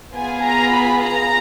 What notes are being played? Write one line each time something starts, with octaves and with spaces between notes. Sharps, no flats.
B3 F4 G#4 G#5
A#5
B5
A#5